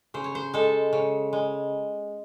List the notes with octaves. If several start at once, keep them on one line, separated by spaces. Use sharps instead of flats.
C#3 C5
C#5
C5
G#3 A4
C#3
G#3